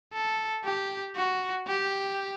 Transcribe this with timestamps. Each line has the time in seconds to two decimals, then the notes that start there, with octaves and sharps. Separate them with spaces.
0.13 A4
0.64 G4
1.16 F#4
1.67 G4